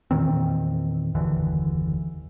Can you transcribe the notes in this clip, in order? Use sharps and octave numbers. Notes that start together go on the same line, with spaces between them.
E2 A#2 D#3 C4
F#1 D#2 D3 E3